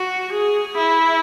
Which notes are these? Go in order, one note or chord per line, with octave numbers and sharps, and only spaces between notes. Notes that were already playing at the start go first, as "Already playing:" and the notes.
Already playing: F#4
G#4
E4